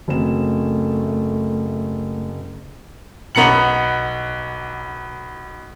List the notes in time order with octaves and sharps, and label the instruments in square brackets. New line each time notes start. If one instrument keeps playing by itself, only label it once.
[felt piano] F#1 C4 E7 [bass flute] A3
[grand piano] B1 B3 A#5 C#7 F#7